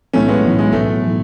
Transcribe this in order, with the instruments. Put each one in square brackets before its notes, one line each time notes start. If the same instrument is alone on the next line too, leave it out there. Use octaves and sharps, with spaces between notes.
[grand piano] B1 A2 E3 [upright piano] A3 C#4
[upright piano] G#3 B3
[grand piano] B1 A2 E3
[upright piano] G#3
[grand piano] B1 A2 E3 [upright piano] A3
[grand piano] A2 E3